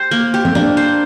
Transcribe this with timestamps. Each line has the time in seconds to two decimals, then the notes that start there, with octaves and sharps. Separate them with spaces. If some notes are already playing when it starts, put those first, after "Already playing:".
Already playing: G4 C5
0.11 A#3
0.34 G4
0.45 C4
0.55 A#3 D4
0.77 C5